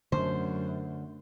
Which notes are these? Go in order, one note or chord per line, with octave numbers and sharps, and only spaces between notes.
F#2 D3 A3 C#4 C5